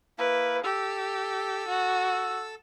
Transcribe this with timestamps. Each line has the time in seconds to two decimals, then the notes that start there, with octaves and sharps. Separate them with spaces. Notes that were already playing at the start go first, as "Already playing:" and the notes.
0.18 A#3 E4 B4
0.64 G4 A4 E6
1.68 F#4